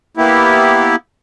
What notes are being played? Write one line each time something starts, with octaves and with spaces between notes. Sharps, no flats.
A#3 B3 E4 G4